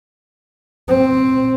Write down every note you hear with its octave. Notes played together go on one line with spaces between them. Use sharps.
C4